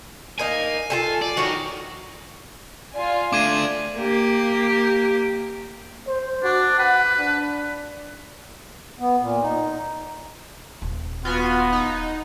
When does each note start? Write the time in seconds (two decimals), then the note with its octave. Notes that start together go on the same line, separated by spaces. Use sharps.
0.39 A#3 D#4 G#5
0.90 F4 G#4 A4
1.22 D5
1.37 D#3 F#4 C#5
2.94 F4 D5 G#5
3.33 A3 D4 D6 G#6 D#7
3.97 A#3 G4
6.07 C5
6.44 D4 F#4
6.79 B4 F#5
7.19 D4
8.99 B3
9.20 A#2
9.42 D#4
10.82 D#1
11.25 B3 F4 F#4 G#5
11.72 D#4